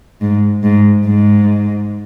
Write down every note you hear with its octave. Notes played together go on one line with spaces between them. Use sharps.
G#2
G#2
G#2